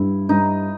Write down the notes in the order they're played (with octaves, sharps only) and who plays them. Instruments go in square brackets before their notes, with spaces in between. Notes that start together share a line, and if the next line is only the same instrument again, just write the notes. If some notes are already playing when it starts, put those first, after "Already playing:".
Already playing: [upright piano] G2 [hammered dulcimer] E4
[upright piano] G2 [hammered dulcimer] D#4